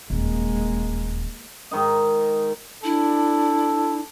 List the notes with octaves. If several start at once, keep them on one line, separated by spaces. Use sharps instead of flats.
D#1 E2 G#3 A#3
G#2 D#3 D#5
D4 E4 A4